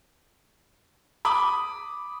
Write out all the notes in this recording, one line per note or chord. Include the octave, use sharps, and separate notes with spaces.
B5 D6 D#6